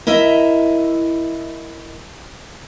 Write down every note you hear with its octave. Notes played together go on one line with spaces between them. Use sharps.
E4 A#4 D#5 E5